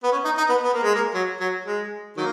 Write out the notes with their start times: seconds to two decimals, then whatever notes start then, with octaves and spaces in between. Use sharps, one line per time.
0.04 B3
0.12 C#4
0.25 D#4
0.37 D#4
0.50 B3
0.63 B3
0.73 A#3
0.83 G#3
0.94 A#3
1.14 F#3
1.40 F#3
1.65 G#3
2.17 D#3 F#3 A#3